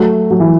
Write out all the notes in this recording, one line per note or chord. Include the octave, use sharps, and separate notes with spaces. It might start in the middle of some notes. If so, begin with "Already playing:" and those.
Already playing: F#3 A3
F#3
E3